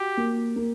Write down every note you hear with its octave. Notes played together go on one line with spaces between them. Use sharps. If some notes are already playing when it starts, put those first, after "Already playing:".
Already playing: F#4 G4
A#3
A#3